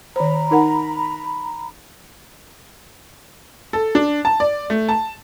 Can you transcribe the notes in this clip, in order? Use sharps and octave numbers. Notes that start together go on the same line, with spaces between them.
D#3 C5 A#5 B5
D#4 A#4 F#5
A4
D4
A5
D5
A3
A5